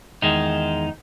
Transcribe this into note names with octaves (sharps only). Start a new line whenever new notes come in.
E2 D#3 G#3 D#4